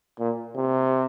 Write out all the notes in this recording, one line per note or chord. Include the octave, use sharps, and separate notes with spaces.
A#2
C3